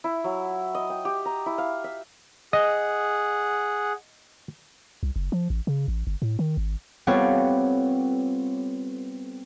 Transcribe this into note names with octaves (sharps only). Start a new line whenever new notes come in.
E4
F#3
D#5
G5
G4
A#5
E4
F5
E5
G#4 D#5 F#5
C2
F#1
F3
A1
C#3
A1
G1
A2
D#3
G#1
G3 B3 C4 F4 A4 C#5